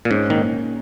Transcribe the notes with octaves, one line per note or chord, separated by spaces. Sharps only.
A#2
G#2 C#4
A#2 D#3